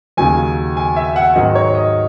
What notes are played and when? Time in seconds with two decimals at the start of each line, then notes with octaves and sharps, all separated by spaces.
0.17 D#2 C#3 F#3 G#5
0.77 G#5
0.96 E5
1.16 F#5
1.35 G#2 D#3 F#3 D#5
1.55 C#5
1.75 D#5